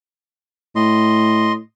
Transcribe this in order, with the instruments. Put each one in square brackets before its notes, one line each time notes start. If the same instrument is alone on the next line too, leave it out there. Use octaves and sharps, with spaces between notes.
[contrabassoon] A2 [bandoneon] D#5 C6